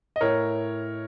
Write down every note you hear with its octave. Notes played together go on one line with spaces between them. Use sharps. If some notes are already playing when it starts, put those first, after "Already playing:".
D#5
A2 A#4 C#5